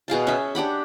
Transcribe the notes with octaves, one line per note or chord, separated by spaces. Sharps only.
B2 G#4 F5 A5
C#4 E5
D4 G4 F#5 B5